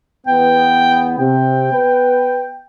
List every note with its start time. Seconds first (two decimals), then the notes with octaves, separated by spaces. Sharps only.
0.27 E2 B3 G5
1.18 C3 G5
1.72 B3 B4